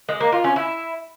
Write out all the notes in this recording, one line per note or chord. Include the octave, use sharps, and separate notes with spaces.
G#3
A#3
F4
C#4
E4